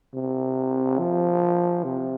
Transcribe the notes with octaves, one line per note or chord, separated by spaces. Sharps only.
C3
F3
C3